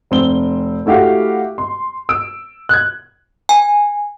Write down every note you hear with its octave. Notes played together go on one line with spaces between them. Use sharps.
F1 C4 G7
A3 E4 F#4 G4 F5
C6
E6 D7
F#6 G#6
G#5